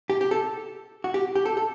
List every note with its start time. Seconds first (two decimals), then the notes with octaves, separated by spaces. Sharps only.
0.10 G4
0.21 G4
0.31 A4
1.04 F#4
1.14 G4
1.36 G4
1.45 A4
1.57 A4